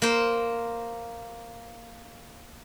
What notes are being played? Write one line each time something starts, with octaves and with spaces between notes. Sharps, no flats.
A#3 C5